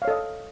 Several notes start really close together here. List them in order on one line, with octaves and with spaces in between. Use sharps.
F5 C#5 A4 D#5